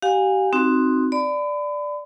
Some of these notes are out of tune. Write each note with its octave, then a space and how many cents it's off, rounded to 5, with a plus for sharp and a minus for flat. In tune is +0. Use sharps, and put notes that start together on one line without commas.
G4 -30 F5 +35 G#5 -25
C4 +0 D#4 +0 F#4 +0
D5 +0 B5 +35